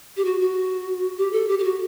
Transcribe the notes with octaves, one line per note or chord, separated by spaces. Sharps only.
G4
F#4
F#4
G4
A4
G4
G4
F#4